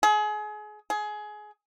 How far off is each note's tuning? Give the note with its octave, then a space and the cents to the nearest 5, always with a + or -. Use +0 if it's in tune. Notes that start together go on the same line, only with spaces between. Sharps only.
G#4 +30
G#4 +20